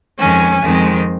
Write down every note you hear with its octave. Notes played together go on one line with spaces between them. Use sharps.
F2 D#3 G#3 C#4 G#5
F2 D#3 G#3 C4